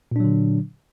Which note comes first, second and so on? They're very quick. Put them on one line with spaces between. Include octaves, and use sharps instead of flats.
A#2 D4 F#3 D3